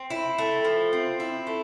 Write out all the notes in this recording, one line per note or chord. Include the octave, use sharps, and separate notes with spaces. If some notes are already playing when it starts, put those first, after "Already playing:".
Already playing: C4
E4
A3
F3
C4
E4
A3